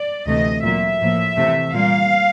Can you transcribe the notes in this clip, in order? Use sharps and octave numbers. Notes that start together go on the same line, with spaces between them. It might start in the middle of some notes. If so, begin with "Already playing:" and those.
Already playing: D5
D2 C3 E3 A3 D#5
A#2 F#3 A#3 E5
A2 F3 A#3
C3 E3 A3
A#2 G3 A#3 F5